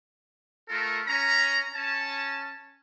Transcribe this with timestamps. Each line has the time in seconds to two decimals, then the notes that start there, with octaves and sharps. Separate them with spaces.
0.69 A3 F4 A4 A#4
1.07 C#4 A#5
1.75 C#4 A5